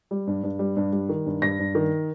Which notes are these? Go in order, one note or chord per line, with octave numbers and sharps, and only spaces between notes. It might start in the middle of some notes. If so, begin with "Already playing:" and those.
G3
G2
G2
G3
G2
G3
D#3
G2
G2 A#6
G2
D#3